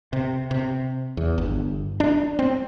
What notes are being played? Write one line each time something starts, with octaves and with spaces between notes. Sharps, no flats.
C3
C3
E2
G1
D4
C4